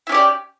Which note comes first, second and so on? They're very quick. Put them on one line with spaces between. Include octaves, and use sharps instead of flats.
E4 C#4 D5 G4